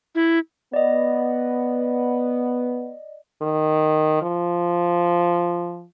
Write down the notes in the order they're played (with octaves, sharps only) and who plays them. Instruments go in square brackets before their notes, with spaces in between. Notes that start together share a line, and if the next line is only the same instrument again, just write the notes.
[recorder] E4
[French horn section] B3 [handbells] D5 D#5
[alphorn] D#3
F3